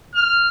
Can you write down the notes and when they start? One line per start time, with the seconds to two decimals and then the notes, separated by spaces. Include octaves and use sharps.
0.15 F6